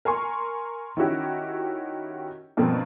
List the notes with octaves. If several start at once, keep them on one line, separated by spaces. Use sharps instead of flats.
A#4 G#5 C6 C#6
D#3 C#4 E4 F#4 G4
G2 B2 F3 A#3 C4